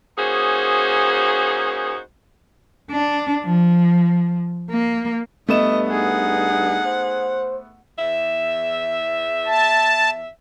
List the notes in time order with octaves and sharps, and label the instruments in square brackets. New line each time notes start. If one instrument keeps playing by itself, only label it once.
[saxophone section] A#3 C#4 D#4 F#4 G#4 C5
[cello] D4
F3
A#3
[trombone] G2 [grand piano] A3 B3 E7 [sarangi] D#5
[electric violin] D#4 G#4 [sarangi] F#5
[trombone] C5
[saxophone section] E2 E5
[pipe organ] A5